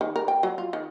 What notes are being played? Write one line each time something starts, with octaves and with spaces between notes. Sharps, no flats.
D#3
A#4
G5
F#3
F4
D#3